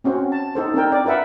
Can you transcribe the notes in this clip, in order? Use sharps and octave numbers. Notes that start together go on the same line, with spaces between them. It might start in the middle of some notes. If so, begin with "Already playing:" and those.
C4 C#4 F#4 C5
A5
D#4 A4 C5
C4 D4 A#4 G5
D5
F4 A#4 B4 E5 F#5